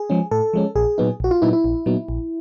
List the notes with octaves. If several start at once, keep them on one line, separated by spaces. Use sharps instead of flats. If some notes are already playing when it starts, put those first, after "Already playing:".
Already playing: G#4
F3 G#3 C#4
A2 A4
F3 G#3 C#4
A#1 G#4
A#2 F#3 B3 D#4
A#1 F#4
F4
A#2 F#3 B3 D#4 E4
E4
A#1
A#2 F#3 B3 D#4
A#1